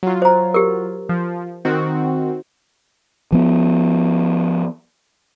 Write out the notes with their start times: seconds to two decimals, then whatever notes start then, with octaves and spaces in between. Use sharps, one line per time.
0.03 F#3 F4
0.22 C5 A#5
0.54 G4 A#4
1.09 F3
1.65 D#3 C4 F#4
3.32 F3 B3